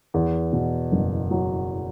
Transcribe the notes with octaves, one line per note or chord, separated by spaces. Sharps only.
E2
B2
F#1
F#3